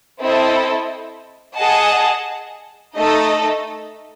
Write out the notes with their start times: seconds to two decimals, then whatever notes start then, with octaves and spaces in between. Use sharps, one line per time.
0.20 C4 E4 A4 D#5
1.58 G#4 D#5 F#5 A5
2.95 A3 D#4 A4 D#5